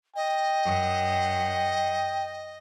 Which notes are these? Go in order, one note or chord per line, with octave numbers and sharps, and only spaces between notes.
D#5 G5
F#2 F#5